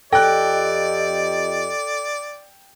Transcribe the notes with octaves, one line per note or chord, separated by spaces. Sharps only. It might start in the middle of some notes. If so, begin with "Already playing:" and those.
F2 G4 A4 D5 D#5 G5 F#6